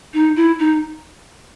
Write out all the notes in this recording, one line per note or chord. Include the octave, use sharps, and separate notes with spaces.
D#4
E4
D#4